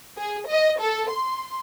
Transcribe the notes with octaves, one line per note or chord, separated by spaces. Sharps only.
G#4
D#5
A4
C6